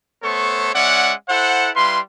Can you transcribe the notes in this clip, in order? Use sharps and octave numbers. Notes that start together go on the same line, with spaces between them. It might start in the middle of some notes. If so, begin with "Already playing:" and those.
A3 B3 A4 C5 C#5 C#6
G#3 C#4 D5 E5 F#5
E4 A4 C5 F#5
G3 E4 B4 F5 C6